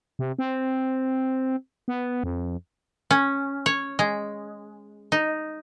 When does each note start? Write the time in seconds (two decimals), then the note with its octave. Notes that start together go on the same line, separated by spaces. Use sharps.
0.19 C3
0.39 C4
1.88 B3
2.23 F2
3.10 C#4
3.66 C#5
3.99 G#3
5.12 D#4